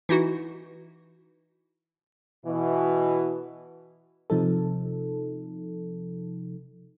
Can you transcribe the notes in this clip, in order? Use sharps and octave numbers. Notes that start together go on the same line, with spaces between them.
E3 D#4 E4 F#4
B2 E3
C3 F3 D#4 A4